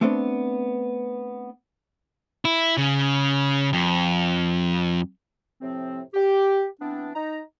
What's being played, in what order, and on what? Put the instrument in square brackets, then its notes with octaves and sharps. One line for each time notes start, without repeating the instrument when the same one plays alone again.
[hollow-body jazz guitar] A3 B3 C4 D4 A4
[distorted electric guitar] E4
C#3
F2
[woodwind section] A2 C3 F3 C4
G4
E3 B3 C4 D4
D#4 A#5